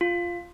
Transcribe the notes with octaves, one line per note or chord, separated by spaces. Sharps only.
F4